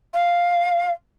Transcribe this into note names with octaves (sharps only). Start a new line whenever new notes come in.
F5